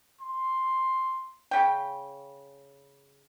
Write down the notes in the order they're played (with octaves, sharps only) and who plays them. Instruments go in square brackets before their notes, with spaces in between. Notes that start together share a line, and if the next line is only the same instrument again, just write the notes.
[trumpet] C6
[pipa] C#3 G5